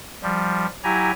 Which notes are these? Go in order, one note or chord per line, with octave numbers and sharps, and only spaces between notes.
F3 G3
F#3 E4 G4 G#5 A#5